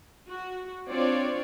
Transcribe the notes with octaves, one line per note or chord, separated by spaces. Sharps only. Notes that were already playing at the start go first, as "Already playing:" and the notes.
F#4
C4 D4 F4 C#5 D5